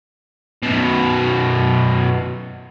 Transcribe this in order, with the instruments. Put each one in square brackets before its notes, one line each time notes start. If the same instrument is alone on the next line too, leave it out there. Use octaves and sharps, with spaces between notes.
[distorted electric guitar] F#2 B2